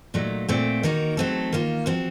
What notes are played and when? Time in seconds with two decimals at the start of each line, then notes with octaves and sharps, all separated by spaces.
0.14 A#2 F#3 A3 D#4
0.49 A#2 A3 C4
0.83 D#3 A#3 D#4 F#4 A#4
1.17 F#3 A3 C4 D#4 A4
1.53 D#3 A#3 F4
1.86 F3 C4 F#4